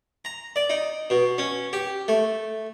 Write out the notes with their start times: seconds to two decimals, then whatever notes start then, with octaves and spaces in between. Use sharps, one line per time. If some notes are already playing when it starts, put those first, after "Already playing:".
0.25 A#5
0.56 D5
0.70 D#4
1.10 B2
1.38 C#4
1.73 G4
2.08 A3